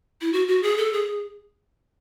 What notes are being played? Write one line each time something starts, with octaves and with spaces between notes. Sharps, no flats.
E4
F#4
F#4
G#4
A4
G#4